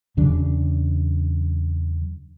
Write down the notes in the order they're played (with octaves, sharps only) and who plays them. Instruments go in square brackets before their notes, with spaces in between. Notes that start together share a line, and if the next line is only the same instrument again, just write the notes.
[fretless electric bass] E2 C#3 F#3 D4